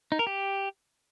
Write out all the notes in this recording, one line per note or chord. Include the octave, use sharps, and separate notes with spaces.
D#4
A#4
G4